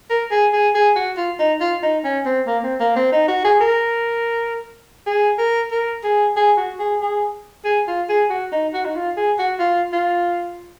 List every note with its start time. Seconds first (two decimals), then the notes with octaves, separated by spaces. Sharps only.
0.10 A#4
0.31 G#4
0.53 G#4
0.75 G#4
0.96 F#4
1.17 F4
1.39 D#4
1.61 F4
1.83 D#4
2.04 C#4
2.25 C4
2.47 A#3
2.63 C4
2.80 A#3
2.96 C4
3.12 D#4
3.28 F#4
3.45 G#4
3.60 A#4
5.07 G#4
5.38 A#4
5.71 A#4
6.04 G#4
6.37 G#4
6.57 F#4
6.79 G#4
7.01 G#4
7.65 G#4
7.87 F4
8.09 G#4
8.30 F#4
8.52 D#4
8.74 F#4
8.85 D#4
8.95 F4
9.17 G#4
9.39 F#4
9.59 F4
9.93 F4